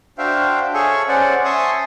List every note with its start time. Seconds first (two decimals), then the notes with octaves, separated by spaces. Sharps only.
0.18 D4 F#4 C5 E5 F5 G5
0.74 G#4 A4 C#5 E5 G#5 C#6
1.08 C#4 C5 D5 F#5
1.45 E5 G#5 A5 C6 C#6 D#6